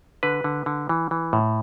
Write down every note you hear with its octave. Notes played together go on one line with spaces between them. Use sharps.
D3 B4
D3
D3
E3
E3
A2